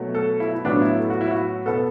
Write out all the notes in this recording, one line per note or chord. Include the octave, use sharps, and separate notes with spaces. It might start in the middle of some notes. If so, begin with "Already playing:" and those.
Already playing: B2 F#3 A3
A4
E4
E4
A2 F#3 B3 D4
E4
A4
F#4
E4
F#4
B2 B3 A4